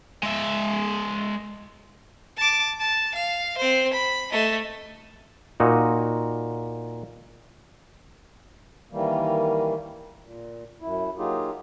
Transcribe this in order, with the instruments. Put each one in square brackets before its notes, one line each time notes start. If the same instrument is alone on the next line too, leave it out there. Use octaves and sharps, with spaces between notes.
[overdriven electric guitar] G#3 E5
[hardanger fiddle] A5 D6
A5
F5
C4 C5
B5
A3 D#5
[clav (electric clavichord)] A#2 D#4 F#4
[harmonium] D#3 E3 G3 A#3
A#2
F#2 E4
F#3 A#3 D#4 F4 G4 G#4